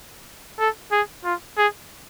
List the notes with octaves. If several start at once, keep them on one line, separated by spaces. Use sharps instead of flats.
A4
G#4
F4
G#4